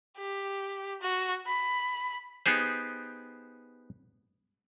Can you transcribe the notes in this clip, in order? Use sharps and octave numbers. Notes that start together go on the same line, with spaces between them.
G4
F#4
B5
B3 D#4 G4 G#4 C5